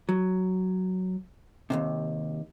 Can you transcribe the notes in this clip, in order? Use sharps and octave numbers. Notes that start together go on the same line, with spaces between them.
F#3
D#2 G#2 C3